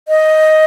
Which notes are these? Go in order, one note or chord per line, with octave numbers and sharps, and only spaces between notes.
D#5